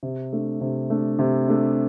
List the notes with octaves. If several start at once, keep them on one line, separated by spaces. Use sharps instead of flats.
C3
A3 D4
C3
A3 D4
C3
A3 D4